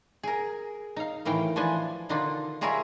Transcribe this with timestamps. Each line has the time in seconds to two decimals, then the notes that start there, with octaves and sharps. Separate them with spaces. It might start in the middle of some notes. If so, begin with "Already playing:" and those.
0.23 G#4 A#4
0.96 D#4 F5
1.25 A2 D#3 E3 F5 G5
1.56 E3 F3 D4 G#5 A5
2.09 B2 D3 D#3 D4 D#4 F4
2.61 G3 F4 G#4 A#4 C#5 E5